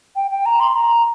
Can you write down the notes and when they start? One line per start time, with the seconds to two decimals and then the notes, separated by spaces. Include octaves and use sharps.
0.16 G5
0.31 G5
0.46 A#5
0.60 C6
0.75 A#5